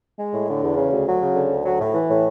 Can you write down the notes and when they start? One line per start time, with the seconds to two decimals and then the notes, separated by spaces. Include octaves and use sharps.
0.18 G#3
0.33 A2
0.48 D3
0.63 E2
0.77 C#3
0.92 D2
1.07 F#3
1.21 C#3
1.36 D3
1.51 D2
1.65 F#3
1.80 A2
1.94 E3
2.09 A2